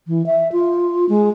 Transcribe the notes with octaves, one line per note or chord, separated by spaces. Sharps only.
E3
E5
F4
G#3